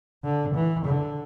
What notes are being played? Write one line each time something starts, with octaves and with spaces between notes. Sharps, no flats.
D3
E3
D3